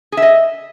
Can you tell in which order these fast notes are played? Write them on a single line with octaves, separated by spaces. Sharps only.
G#4 E5 D#5